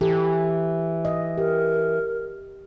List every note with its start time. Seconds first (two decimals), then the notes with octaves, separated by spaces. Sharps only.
0.01 E3 G4 A4
1.05 D#5
1.37 G4 A#4